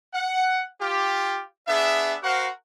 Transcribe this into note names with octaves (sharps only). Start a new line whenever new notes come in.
F#5
F4 G4
B3 D4 G#4 E5
F#4 A#4 C5 F5 F#5